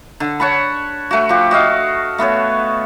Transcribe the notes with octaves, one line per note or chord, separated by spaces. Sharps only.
D3
C#5 F#5 A5 B5
A3 F#4
F3 G4
F#4 D#5 F5
A3 B3 A4 C#5